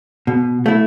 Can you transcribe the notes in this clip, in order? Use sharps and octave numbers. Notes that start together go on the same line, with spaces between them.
B2
A3 E4